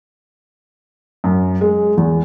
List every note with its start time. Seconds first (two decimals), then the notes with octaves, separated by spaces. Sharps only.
1.24 F#2
1.61 G#3
1.97 E2